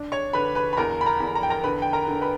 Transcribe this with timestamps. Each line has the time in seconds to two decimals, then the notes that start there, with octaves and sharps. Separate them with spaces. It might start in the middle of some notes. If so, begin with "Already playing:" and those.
Already playing: D4
0.12 C#5 C#6
0.33 D3 B4 B5
0.55 B4 B5
0.73 B5
0.77 E2 A#4 A#5
1.01 B5
1.06 A#4 A#5
1.20 E2
1.35 A#5
1.43 G5
1.50 A#4 A#5
1.64 D3 B4 B5
1.82 G5
1.93 A#4 A#5
2.08 D3
2.21 B4 B5